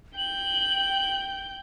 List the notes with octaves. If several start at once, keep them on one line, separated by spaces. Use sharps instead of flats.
G5 G6 F#7